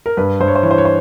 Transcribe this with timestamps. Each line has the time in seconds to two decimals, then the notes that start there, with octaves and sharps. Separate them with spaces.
0.06 A#4
0.17 G2 B4
0.40 G2 C5
0.48 C#5
0.56 C5
0.63 E3 C#5
0.71 C5
0.78 C#5
0.85 C5